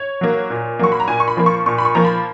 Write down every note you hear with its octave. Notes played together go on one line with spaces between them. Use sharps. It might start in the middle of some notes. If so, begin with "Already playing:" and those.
Already playing: C#5
F#3 A#3
A#2
F#3 A#3 C#6
B5
A#5
A#2 G#5
C#6
B5
F3 A#3
C#6
A#2 C#6
B5
C#6
F3 A#3 A#5
B5